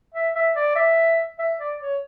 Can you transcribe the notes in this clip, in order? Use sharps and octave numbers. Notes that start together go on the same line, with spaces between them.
E5
E5
D5
E5
E5
D5
C#5